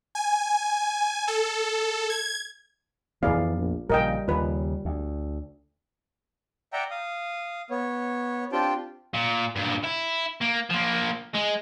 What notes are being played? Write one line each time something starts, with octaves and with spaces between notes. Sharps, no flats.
G#5
A4
G#6
F2 E3 B3 G#4 D5 F5
A#1
A#1 A#2 C#3 G3 A#4 D#5 G5
D#2 C#3 F4 B4
D2
D5 E5 F#5 G5 A#5
F5 D#6
B3 C#5
C4 D4 F4 G4 G5 A5
A#2
G2 A#2
E4
A#3
F3 A#3
G#3